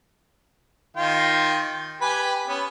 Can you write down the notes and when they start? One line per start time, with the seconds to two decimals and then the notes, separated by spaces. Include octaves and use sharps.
0.97 D#3 F4 G5
2.01 G4 B4 G#5
2.48 B3 C#4